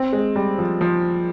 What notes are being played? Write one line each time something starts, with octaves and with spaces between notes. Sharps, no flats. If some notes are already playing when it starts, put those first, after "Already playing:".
Already playing: C4
G#3
G3
F3
F3